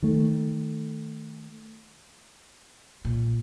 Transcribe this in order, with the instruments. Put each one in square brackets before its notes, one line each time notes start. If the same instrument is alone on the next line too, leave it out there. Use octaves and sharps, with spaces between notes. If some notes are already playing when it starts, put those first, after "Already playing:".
[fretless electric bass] D#3 A3
[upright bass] A#2